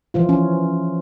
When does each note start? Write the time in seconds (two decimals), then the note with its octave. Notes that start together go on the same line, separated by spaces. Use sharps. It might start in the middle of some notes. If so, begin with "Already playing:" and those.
0.14 E3 F3 F4
0.29 C#4